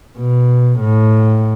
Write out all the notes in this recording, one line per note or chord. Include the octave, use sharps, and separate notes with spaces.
B2
A2